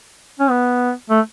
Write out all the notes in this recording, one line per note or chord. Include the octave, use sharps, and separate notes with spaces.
C#4
B3
A3